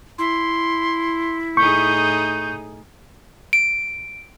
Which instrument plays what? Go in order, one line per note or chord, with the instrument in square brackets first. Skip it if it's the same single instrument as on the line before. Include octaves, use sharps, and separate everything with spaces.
[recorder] E4 [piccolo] C6
[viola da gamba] A2 D#4 G#4 [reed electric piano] C#6 [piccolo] G6
[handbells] D7